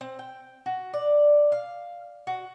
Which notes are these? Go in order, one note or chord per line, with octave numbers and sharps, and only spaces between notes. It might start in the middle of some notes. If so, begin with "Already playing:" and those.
C4
G5
F#4
D5
F5
F#4